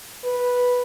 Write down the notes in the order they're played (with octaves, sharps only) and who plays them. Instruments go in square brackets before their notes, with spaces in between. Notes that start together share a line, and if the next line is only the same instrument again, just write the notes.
[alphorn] B4